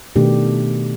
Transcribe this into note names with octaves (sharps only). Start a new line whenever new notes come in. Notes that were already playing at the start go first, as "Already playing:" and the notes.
B2 D#3 A3 D4 G4